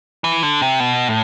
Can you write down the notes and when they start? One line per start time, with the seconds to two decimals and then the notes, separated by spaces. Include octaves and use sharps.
0.24 E3
0.43 D3
0.62 C3
0.80 B2
1.09 A2